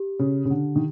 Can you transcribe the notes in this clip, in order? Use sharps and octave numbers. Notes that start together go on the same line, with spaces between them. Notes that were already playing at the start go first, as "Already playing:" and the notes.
Already playing: G4
C#3
C#3
D3
D#3